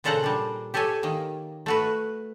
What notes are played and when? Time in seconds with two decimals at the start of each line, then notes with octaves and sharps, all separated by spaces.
0.04 A#2 C#3 A4 C5 F#5 A#5
0.24 G3 D4
0.74 G4 A4 C#5 E5 G#5
1.03 D#3 A#3
1.66 A3 F#4 B4